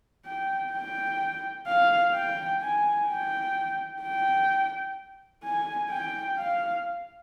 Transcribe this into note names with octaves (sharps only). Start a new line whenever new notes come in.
G5
G5
F5
G5
G#5
G5
G5
G#5
G5
F5